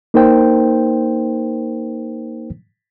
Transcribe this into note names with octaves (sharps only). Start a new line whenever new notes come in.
A#3 D#4 A#4 C5 G5